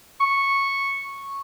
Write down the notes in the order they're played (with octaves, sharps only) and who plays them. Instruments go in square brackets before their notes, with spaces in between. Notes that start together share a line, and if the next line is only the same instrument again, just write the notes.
[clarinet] C#6